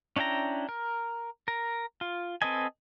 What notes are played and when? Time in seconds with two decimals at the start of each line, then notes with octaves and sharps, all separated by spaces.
0.16 C#4 D4 E4 G5 A#5
0.69 A#4
1.48 A#4
2.01 F4
2.42 C4 A4 B4 D#5 G#5